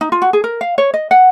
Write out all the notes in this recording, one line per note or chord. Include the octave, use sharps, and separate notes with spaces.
D#4
F4
F#4
G#4
A#4
F5
C#5
D#5
F#5